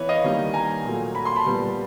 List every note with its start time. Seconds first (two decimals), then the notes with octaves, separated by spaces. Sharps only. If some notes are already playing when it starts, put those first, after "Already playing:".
Already playing: E3 B3 B4 C#5
0.09 D#5 F5
0.24 D#3 G3 A#3
0.54 G#5 A#5
0.85 A#2 F#3 A3
1.15 B5
1.25 C6
1.36 A5 B5
1.46 A#2 G3 B3